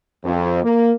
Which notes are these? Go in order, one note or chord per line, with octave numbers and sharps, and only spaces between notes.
F2
A#3